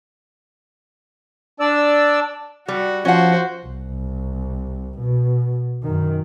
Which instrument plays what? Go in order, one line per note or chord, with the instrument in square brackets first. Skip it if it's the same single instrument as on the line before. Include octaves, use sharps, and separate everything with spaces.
[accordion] D4 D5 E6
[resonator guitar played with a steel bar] G3 [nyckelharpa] F#4
[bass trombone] F3 [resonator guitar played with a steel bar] C#4 F#5 [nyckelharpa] F#4 C5
[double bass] C2
B2
F#2 D#3